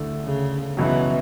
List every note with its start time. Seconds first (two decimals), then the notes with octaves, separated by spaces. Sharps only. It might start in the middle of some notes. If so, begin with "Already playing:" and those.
Already playing: D2 D3 A3 E4 A4
0.24 C#3
0.77 C#2 B2 E3 F#3